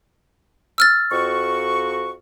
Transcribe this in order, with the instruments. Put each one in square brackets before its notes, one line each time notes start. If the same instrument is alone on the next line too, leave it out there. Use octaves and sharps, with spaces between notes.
[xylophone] E6 F6 A6
[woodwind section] F2 F#4 C#6